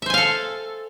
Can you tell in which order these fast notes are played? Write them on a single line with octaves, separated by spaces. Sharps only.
E5 C5 G#5 F5 A4